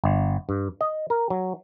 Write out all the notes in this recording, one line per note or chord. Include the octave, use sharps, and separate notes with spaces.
G1
G2
D#5
A#4
F#3